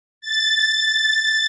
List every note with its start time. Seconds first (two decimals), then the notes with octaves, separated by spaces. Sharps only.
0.21 A6